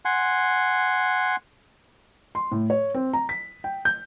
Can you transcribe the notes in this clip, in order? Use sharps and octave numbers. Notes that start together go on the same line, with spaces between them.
F#5 G#5 C6
C6
A2
C#5
C4
A#5
B6
G5
G6